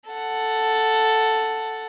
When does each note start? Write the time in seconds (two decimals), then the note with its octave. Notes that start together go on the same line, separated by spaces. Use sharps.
0.10 A4 F#5